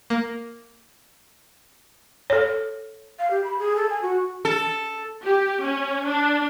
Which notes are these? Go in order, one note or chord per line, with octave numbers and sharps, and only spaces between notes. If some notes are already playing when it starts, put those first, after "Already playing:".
A#3
A4 C#5
F5
G4
B5
G#4
A4
G#5
F#4
A4
G4
C#4
D4